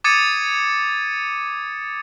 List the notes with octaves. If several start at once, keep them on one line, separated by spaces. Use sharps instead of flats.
D6 D#6 G#6 A6 C#7 D#7